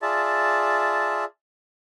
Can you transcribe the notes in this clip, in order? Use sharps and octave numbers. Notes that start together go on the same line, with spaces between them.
F4 G#4 D5 E5 A5